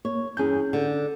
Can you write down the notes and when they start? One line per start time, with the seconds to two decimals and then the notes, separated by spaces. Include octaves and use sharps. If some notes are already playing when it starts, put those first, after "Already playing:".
0.05 A#3 C#5
0.37 E2 G2 C#4 G#4 G6
0.73 D3